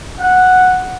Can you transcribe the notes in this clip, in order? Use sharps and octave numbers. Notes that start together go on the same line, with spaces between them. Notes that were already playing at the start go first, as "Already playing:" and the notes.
F#5